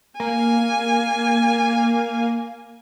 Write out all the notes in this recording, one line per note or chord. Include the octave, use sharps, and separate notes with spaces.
A#3 G#5